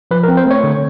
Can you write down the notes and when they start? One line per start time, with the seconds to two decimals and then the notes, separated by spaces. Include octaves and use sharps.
0.11 F3 B4
0.23 A#4
0.28 C4
0.37 C5
0.46 A3 C#5
0.64 D3